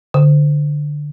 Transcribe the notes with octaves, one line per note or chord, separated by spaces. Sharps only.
D3